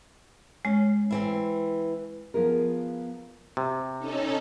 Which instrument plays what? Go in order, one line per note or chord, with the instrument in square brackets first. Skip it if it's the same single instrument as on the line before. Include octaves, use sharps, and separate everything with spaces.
[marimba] G#3 [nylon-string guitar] C#4
[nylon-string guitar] E3 C4 E4
F3 B3 F4 G#4 A#4
[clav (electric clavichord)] C3
[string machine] C#4 D#4 A4